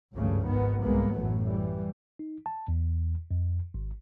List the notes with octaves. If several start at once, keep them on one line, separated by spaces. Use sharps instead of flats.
G#1 C#2 G2 C#3 F3 A3
G#1 G#2 D#3 B3
C2 G#2 G#3 A#3 B3
A1 F#2 A2 F#3 A3
E3 G3
D#4
A5
E2
F2
G#1